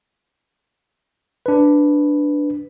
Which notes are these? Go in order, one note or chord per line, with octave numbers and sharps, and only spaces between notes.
D4 B4